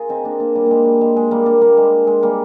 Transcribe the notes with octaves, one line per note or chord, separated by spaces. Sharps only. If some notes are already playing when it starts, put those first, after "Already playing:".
Already playing: F4 G#4 A#4
C4 D#4
A#3 D4
A#3 D4
G3 A#3
G#3 A#3
G3
G#3
G#3
G3 A#3
A#3 D4
G3 A#3
G#3
G#3
G3 A#3